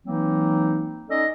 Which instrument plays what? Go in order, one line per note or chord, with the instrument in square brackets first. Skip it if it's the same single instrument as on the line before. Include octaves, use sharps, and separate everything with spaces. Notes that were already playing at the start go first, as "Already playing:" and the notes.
[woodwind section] E3 F#3 A#3 C4 D#4
C#4 D#4 A4 D5 D#5